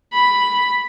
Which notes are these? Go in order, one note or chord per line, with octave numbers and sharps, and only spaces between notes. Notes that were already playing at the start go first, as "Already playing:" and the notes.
B5